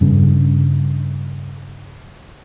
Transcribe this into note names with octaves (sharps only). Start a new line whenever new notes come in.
G2 C#3